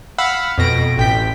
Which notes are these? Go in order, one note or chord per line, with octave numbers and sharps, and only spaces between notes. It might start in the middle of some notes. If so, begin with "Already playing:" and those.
F5 F#5 B5 E6 F#6
F2 B2 A#6 D7
A1 G5 B6